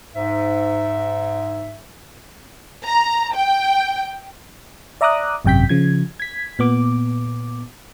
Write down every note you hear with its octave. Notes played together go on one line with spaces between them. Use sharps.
G#2 E5
A#5
G5
D5 E5 A#5 D6 D#6 F#6
G#1 F#2 C3 G5 G6 B6
C#3 F3 G#6
G#6 B6
A#2 B3 D6